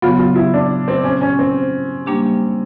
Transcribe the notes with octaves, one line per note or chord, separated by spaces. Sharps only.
C#3 F#3 B3 F4
F4
E4
D4
C4
C#4
C#4
C4
G3 A#3 D4 G4